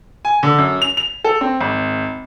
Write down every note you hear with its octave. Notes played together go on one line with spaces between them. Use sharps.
G#5
D3
F#2
F7
F7
A4
C4
G#1